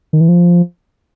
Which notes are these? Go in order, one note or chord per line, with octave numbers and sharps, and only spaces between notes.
D#3
E3
F3